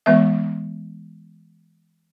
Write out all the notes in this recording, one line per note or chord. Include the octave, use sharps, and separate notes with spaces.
E3 G#3 B3 E5